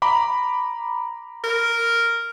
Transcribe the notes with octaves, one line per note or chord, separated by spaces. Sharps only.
A#5 B5 D6
A#4